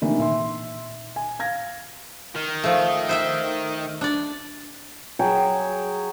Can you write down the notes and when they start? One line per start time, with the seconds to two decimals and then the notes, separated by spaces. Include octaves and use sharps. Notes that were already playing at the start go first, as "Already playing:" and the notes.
0.02 C3 D#3 E3 A3 A#3 D4
0.19 A#2 D#3 E5 C6
1.16 G#5
1.39 F5 G#6 A#6
2.36 D#3
2.64 F3 A3
3.09 C5 E5 G5
4.01 D4 D5
5.19 F#3 G#4 G5